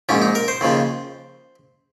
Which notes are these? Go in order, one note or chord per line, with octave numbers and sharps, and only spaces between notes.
A#1 G#2 F3 C#4
D#4
A#4
C5
D#2 C#3 F3